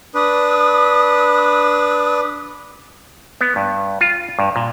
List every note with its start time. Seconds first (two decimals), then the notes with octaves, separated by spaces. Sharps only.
0.15 D4 B4 D#6
3.41 B3
3.56 G2
4.01 F4
4.39 G2
4.56 A#2